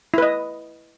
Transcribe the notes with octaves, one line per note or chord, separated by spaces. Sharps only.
E4 B4 D#5